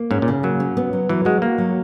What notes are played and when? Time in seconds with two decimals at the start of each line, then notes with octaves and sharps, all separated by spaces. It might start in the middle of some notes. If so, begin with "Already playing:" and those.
Already playing: A#3
0.11 G#2 C#4
0.22 A#2
0.28 C#3
0.43 F#3 A#3
0.60 C#4
0.77 B3
0.93 F#3
1.09 E3 F#3
1.25 G#3 F#4
1.42 A#3 F#4
1.58 F#3